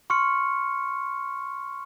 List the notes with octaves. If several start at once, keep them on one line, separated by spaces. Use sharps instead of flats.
C6 C#6 F6 C#7